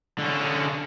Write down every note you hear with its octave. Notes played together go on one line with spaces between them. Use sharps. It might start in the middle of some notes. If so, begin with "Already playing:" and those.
D3 C#4